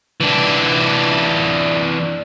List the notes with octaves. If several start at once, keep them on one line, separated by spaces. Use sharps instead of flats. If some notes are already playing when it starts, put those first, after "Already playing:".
E3 D4